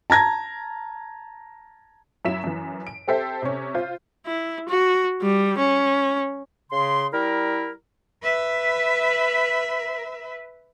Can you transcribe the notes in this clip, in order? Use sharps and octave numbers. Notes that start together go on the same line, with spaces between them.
A5 A#5 G#6 A#6
F#2 F#3 E4 B6 E7
F#2 E3
D7
C4 G4 A4 C5 E5
C3 C#4
F4 C5
E4
F#4
G3
C#4
C#3 C6
G3 E4 A#4
B4 E5